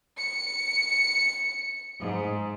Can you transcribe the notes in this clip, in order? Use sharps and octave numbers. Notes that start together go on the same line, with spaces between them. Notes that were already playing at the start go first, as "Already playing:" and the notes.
C#7
G#2